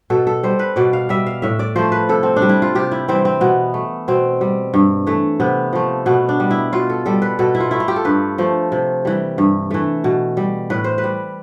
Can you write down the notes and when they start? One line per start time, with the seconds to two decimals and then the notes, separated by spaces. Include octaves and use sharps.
0.10 B2 A4
0.27 A4
0.43 G3 C5
0.59 B4
0.76 B2 D5
0.93 F5
1.09 G3 E5
1.26 F5
1.42 A2 E5
1.59 D5
1.76 F3 A3 C5
1.92 B4
2.09 C3 A4
2.23 C4
2.36 D4
2.42 G3
2.49 E4
2.62 F4
2.75 C3 G4
2.91 E4
3.08 E3 G3 C4
3.25 C4
3.41 B2 B3
3.74 A3
4.08 B2 C4
4.41 G3
4.74 G2
5.07 E3 A3
5.40 C3 B3
5.73 F3 A3
6.06 B2 B3
6.29 D4
6.40 G3
6.51 E4
6.73 B2 F4
6.90 A4
7.06 G3 A4
7.22 B4
7.39 B2 A4
7.55 E4
7.60 F4
7.71 A3 E4
7.80 F4
7.88 G4
7.96 A4
8.05 G2 B4
8.38 F3 A3
8.72 C3
9.05 E3 G3
9.38 G2
9.71 E3 A3
10.04 B2
10.37 G3
10.70 A2 B4
10.84 C5
10.98 B4
11.04 G3